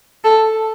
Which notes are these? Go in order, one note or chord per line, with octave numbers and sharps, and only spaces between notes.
A4